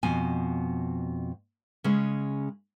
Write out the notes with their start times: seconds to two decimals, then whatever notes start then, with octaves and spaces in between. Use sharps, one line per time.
0.03 F2 B2 G#5
1.84 C#3 G#3 C#4